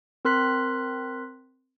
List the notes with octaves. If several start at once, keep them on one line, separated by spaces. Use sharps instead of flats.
C4 A#4 C6 F#6 B6